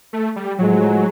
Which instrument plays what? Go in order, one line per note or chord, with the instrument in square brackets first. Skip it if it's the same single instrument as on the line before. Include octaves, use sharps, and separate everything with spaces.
[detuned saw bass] A3
G3
[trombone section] A2 F3 G#3 [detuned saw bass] F#3